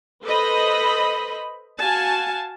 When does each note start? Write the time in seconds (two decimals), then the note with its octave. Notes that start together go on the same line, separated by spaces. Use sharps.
0.24 A4 B4 C5 D#5 B5
1.79 F#4 F5 G#5 A5